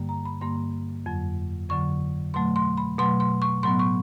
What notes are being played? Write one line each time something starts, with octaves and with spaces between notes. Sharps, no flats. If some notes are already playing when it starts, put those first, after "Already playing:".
Already playing: G2 D3 G3 A#3
A#5
B5
G2 D3 G3 A#3 C6
F2 D3 F#3
F2 D3 F#3 C#6
B2 F#3 A3 C6
C6
B5
B2 F#3 A3 C6
C6
C#6
A2 F#3 B3 C6
C#6